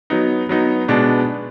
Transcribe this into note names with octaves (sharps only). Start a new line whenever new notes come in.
F#3 B3 D#4
F#3 B3 D#4
B2 G#3 B3 D4